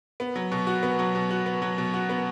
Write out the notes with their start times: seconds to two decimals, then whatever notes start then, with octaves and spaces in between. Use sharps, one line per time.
0.20 B3
0.36 F#3
0.52 B2
0.67 F#4
0.83 B3
0.99 F#3
1.15 B2
1.30 F#4
1.46 B3
1.62 F#3
1.78 B2
1.94 F#4
2.09 B3